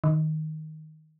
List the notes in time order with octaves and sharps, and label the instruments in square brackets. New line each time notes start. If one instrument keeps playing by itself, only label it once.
[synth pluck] D#3